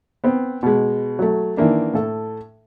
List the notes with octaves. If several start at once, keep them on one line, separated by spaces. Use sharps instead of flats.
B3 C4
B2 G#3
F#3 A3
D#3 E3 A#3 D4
A2 A4